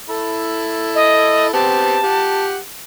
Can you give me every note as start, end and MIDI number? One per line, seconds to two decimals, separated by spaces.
0.10 1.50 64
0.10 1.50 69
0.10 1.50 83
0.95 1.48 75
1.53 1.98 59
1.53 1.98 60
1.53 1.98 67
1.53 2.45 81
2.03 2.58 67
2.03 2.58 78